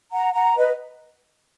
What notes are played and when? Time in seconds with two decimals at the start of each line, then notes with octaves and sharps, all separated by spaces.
0.12 F#5 A#5
0.34 F#5 A#5
0.57 B4 D#5